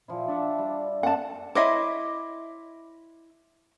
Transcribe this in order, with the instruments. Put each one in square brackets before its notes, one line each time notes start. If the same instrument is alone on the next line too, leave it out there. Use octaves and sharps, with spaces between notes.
[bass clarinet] A#2 [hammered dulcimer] F3 E4
[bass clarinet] D4 [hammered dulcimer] D5 E5 F#5
[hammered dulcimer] G3
[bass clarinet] F#2 [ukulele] F#5 A5
[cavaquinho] E4 C6 D6 [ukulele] C#5 D#5 E5